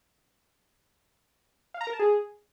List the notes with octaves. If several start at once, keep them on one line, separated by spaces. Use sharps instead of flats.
F5
A#5
A#4
A5
G#4